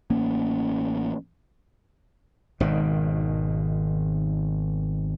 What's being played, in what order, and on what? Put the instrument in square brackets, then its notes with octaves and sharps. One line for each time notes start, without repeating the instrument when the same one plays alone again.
[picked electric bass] A1 A#3 C#4
[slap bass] G#1 B2 D#3